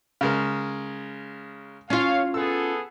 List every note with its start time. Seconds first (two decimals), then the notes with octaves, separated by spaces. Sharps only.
0.21 C#3 G#3 A#4
1.90 C#4 F4 C#5 F5
2.34 B3 G#4 A4 E6